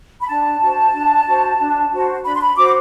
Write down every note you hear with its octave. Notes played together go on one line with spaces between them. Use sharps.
B5
D4 A5
F#4 C5
D4
F#4 C5
D4
F#4 C5
D4 B5
C6
B5
F#4 C5 D6